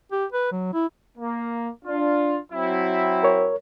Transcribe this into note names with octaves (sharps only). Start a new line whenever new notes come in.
G4
B4
F#3
E4
A#3
D4 F4
F#3 C4 E4
A#4 C#5